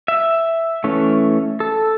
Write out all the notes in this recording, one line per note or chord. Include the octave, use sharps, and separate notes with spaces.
E5
E3 A3 C#4
A4